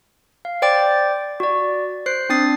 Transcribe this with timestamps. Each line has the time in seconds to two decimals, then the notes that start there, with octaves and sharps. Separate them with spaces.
0.45 F5
0.62 C5 D5 G5 D6 A6
1.40 F#4 D5
2.06 C5 F#6 C7
2.29 C4 D4 D#6 A6 C7